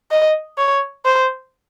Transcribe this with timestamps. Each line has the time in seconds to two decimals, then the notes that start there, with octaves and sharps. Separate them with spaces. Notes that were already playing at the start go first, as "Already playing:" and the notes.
0.11 D#5
0.58 C#5
1.05 C5